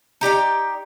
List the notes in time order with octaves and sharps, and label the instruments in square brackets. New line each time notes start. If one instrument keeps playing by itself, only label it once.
[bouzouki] D#4 G4 D5 G5